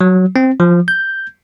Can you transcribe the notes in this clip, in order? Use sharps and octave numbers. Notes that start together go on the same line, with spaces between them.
F#3
C4
F3
G6